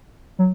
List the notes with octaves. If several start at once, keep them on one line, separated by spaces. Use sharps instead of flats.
F#3